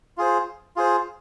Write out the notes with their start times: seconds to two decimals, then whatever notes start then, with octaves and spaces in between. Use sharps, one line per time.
0.17 F4 G#4 C5
0.76 F4 G#4 C5